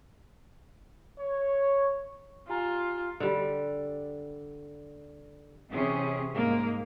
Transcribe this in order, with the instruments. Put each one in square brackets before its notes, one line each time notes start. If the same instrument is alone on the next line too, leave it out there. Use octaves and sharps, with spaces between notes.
[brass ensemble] C#5
[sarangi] F4 [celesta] G4 G#5 A#5
[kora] D3 G3
[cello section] C3 E3 C#4 G#4
G#2 G#3 A#3